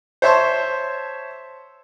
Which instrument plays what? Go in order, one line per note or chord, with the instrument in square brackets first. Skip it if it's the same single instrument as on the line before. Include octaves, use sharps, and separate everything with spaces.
[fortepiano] C5 C#5 E5 A5 C6 C#6